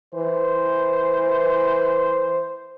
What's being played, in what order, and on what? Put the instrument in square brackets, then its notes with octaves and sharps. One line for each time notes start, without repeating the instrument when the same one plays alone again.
[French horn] E3 [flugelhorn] C5